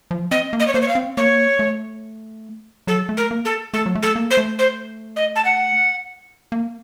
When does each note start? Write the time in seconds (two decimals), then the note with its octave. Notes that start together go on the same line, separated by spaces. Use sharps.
0.11 F3
0.31 C4 D#5
0.53 A#3
0.60 D#5
0.67 C#5
0.74 A#3 C5
0.82 C#5
0.88 F5
0.95 C4
1.17 A#3 C#5
1.59 A3
2.87 F#3 A4
3.09 A3
3.17 A#4
3.31 A#3
3.45 A4
3.73 A3 A4
3.86 F#3
3.95 A3
4.02 A4
4.16 A#3
4.31 C5
4.37 A3
4.59 C5
5.16 D#5
5.36 A5
5.45 F#5
6.52 A#3